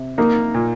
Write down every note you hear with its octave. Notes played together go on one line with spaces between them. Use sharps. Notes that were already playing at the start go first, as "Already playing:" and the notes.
Already playing: C3
A#3 D#4
A#2